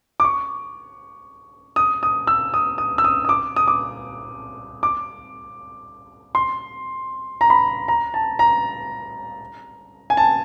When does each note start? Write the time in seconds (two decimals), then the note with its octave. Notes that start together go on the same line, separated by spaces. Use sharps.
0.20 D6
0.24 C#6
1.76 D#6
2.03 D#6
2.27 E6
2.54 D#6
2.78 D#6
2.98 E6
3.04 D#6
3.25 D#6
3.29 D6
3.56 D#6
3.68 D6
4.83 D6
6.35 C6
7.41 A#5
7.50 B5
7.88 A#5
8.14 A5
8.39 A#5
10.10 G#5
10.17 A5